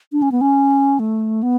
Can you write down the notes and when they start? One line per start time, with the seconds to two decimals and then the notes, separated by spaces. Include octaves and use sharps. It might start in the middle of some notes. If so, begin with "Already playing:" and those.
0.12 D4
0.22 C#4
0.32 B3
0.41 C#4
0.99 A3
1.43 B3